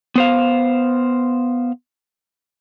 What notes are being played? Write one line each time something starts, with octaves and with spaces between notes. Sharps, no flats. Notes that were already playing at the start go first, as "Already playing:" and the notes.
B3 C5 F5